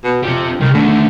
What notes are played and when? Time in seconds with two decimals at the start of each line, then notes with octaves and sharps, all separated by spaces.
0.04 B2
0.23 F2 C4 G4
0.61 C2 D#3 G3
0.74 D3 D#3 A3